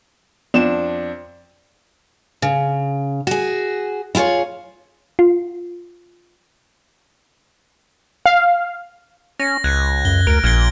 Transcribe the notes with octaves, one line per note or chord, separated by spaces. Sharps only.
F2 B3 D4 E7
C#3
F#4 G#4
E4 F4 G4 G#4 C#5
F4
F5
C#4 A#6
C#2 F#6 G#6
F#2 G7
D2 A#4 D7
A#1 A#2 F6 G#6 G7